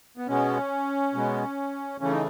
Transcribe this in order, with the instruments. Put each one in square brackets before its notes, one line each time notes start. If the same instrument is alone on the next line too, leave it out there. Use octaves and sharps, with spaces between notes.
[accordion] B3
B2 G#3 B3 C#4
B2 G#3 B3
C#3 E3 A3 C#4
D#4